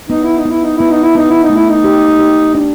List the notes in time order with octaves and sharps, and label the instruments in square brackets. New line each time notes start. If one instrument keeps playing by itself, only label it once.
[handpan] B3 [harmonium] D#4
[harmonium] E4
D#4
[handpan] B3 [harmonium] E4
[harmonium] D#4
[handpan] B3 [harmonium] E4
[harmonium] D#4
E4
[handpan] B3 [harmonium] D#4
[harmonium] E4
D#4
[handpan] A3
[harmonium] E4
D#4
[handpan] G4
G4
D4